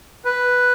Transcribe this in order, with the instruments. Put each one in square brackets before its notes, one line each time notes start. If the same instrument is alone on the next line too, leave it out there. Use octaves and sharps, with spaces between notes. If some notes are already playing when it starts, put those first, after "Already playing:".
[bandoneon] B4